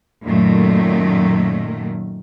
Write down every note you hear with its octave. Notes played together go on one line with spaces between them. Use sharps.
F#2 A#2 D#3 F#3 A3